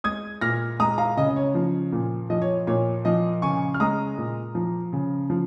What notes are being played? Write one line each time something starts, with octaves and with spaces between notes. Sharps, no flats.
G#3 D#6 G#6
A#2 F6 A#6
G#3 A#5 D#6
F5 A#5
C#3 D#5
D#5
C#5
F3
A#2
F3 D#5
C#5
A#2 C#5
F3 D#5
C#3 G#5 C#6
F6
G#3 A#5 D#6
A#2
F3
C#3
F3